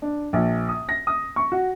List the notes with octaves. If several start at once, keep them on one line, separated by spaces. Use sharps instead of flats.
D4
A#1
D#6
A#6
D#6
C#6
F#4